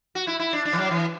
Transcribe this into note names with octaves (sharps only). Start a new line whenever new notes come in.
F#4
E4
E4
D4
D4
E3
F#3
E3